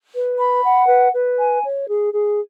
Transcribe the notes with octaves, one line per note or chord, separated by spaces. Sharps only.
B4
B5
F#5
B4
B4
G#5
C#5
G#4
G#4